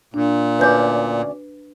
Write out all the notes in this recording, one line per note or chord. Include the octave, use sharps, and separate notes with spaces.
A#2 D4
D2 C#4 B4 D5 G6